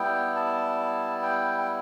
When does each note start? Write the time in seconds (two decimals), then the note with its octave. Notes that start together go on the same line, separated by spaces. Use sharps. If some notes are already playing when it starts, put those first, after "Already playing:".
Already playing: G3 B3 E4 G5
0.36 A5
1.23 G5
1.58 G5